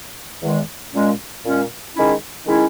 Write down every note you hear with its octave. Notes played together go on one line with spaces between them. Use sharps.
E2 D#3 G#3
A#2 G#3 C#4
A#2 G#3 C#4
D#3 G#3 C#4 E4
D#3 G#3 C#4 E4